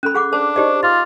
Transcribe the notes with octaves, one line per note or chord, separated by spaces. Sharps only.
C#4 A4 B5 F#6
G#4 F#5 D6
D4 C5
D#4 G4 C5 D5 D#5
F4 D6 F6 A6